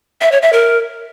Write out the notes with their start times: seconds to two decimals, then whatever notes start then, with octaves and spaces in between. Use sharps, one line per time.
0.21 E5
0.32 C#5
0.42 E5
0.53 A#4